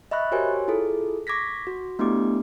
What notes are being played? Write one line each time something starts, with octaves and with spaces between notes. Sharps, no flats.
D#5 E5 B5 C#6 F#6
F#4 G4 A#4 C5 C#5 G#5
E4 F4 G#4 A4
C#6 D6 G#6 A#6 B6
F#4
A3 B3 D4 E4 G4 D6